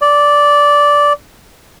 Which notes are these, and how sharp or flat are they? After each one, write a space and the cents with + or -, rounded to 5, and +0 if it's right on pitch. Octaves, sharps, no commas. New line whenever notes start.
D5 -10